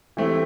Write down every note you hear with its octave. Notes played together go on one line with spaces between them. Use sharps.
E3 A3 C4 E4 G4